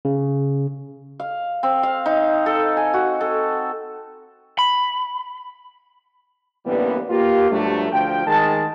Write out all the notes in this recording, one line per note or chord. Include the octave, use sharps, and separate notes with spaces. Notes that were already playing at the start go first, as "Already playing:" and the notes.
C#3
F5
C4
F5
D#4
A4
G#5
F#4
A4
B5
A1 D3 E3 G3 A#3 B3
A#3 F4 G4
G2 F3 F#3 A3
D2 F3 F4 G5
D#3 G#3 G#4 A5